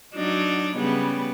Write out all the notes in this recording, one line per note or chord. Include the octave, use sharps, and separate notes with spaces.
F#3 D4 D#4
C#3 G3 B3